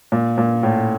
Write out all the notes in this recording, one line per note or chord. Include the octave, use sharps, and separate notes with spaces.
A#2
A#2
A2